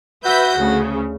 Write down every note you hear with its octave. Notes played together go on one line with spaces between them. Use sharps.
F#4 B4 E5 G6
D2 C#3